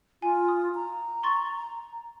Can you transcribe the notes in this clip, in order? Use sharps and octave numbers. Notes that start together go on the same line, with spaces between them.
F4 G#5
D#6
A#5
C6 C#6 A6